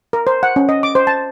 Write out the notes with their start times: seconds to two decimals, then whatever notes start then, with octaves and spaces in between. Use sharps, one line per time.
0.13 A#4
0.27 C5
0.43 F#5
0.56 C#4
0.69 D#5
0.83 D6
0.95 C5
1.07 A5